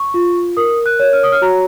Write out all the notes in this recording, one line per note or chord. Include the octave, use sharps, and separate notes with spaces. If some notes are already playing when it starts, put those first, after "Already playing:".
Already playing: C#6
F4
A#4 D#6
F#6
C#5
F6
D#6
F6
F#4 A#5